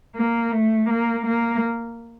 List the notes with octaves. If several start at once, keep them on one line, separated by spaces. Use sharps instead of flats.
A#3
A3
A#3
A#3